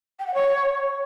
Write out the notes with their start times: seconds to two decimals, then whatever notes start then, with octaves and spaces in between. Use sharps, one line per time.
0.19 G5
0.27 F#5
0.34 C#5